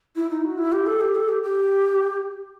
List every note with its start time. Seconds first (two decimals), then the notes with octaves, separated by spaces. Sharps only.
0.16 E4
0.31 D#4
0.44 F#4
0.58 E4
0.72 G4
0.86 A4
1.00 G4
1.15 A4
1.28 G4
1.43 G4